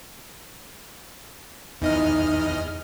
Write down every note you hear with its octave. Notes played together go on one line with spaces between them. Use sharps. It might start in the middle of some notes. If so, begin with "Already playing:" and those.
E2 D#4 D#5 F6